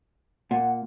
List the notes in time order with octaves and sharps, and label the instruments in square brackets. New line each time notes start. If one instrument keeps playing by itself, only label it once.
[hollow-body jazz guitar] A#2 [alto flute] F#5